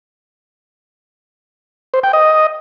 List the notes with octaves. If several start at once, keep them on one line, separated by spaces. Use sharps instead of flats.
C5
G5
D#5